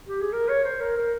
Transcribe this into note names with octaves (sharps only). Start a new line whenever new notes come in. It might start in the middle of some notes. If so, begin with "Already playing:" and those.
G4
G#4
A#4
C#5
C5
A#4
A#4